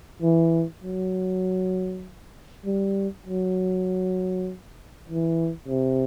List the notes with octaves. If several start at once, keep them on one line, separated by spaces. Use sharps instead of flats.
E3
F#3
G3
F#3
E3
C3